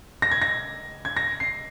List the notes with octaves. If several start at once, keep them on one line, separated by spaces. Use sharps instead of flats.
A#6
G#6
A#6
G#6
A#6
C7